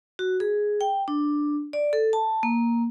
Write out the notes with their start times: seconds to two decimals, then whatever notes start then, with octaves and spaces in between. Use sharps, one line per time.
0.19 F#4
0.40 G#4
0.81 G5
1.08 D4
1.73 D5
1.93 A4
2.13 A5
2.43 A#3